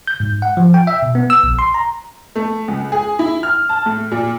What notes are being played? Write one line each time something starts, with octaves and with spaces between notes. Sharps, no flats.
G6
G#2
F#5
F3
G5
E5
B2
B3
E6
A#1
C6
A#5
A3
C#2
G#4
E4
F6
A5
A2
A#2